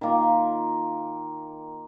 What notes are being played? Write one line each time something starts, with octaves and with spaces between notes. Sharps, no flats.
D#3 A#3 F4